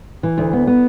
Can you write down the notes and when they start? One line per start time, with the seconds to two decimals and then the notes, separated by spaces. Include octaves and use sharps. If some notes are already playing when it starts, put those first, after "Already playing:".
0.23 E3
0.38 D2
0.53 B3
0.67 B3